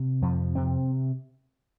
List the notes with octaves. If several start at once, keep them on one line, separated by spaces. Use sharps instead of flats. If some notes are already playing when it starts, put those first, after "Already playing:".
Already playing: C3
F2 F3
C3 C4